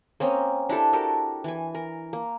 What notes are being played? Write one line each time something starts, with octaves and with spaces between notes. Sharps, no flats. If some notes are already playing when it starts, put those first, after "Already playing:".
A#3 C4 C#4 D#5
D4 E4 G4 A4
F#4 G4 A4 A#4
E3 G#5
A#4
A#3